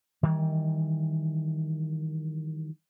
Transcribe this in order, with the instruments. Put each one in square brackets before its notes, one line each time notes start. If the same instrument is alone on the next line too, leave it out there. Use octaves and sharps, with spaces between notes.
[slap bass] D#3 E3 G3